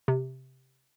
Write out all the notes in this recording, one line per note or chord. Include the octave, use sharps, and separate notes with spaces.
C3